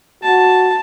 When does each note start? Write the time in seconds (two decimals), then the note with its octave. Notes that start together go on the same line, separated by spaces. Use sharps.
0.23 F#4 A5